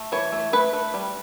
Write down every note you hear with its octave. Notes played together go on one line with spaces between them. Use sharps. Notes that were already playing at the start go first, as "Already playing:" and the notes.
Already playing: A3
E3 C#5
A3
A3 B4
A3
G3